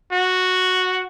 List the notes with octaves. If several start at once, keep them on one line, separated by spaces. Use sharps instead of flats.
F#4